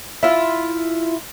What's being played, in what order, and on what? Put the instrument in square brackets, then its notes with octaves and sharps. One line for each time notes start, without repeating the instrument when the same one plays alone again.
[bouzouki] E4 F4